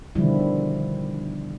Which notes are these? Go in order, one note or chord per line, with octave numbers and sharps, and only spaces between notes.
B2 D3 D#3 F3 G3 E4